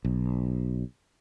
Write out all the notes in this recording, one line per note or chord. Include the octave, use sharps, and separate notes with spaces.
B1